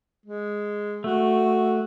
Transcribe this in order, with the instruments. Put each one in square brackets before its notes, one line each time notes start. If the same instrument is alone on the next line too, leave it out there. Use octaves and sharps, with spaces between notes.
[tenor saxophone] G#3
[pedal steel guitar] A3 [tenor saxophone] F#4